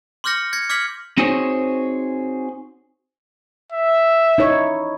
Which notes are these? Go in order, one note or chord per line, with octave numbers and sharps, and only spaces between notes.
C6 D6 F6 G6 A#6 C#7
G#6 A#6 C#7
D6 F6 G#6 B6 C#7 F#7
C4 D#4 F#4 G#4 C5 C#5
E5
D#4 E4 C#5